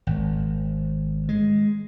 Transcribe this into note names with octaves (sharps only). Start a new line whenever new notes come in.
G#1
G#3